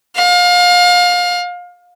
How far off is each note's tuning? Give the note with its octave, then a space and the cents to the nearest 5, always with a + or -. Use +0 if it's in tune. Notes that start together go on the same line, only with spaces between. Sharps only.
F5 +30